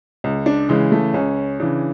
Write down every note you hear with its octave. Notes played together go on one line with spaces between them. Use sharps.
C#2
D4
C#3 E3 G#3
A3
C#2 C#4
C#3 E3 D4